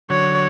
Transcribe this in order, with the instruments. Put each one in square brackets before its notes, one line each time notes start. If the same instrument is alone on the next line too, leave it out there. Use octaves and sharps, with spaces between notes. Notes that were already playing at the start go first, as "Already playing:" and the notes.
[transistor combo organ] D3 F#3 [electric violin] C#5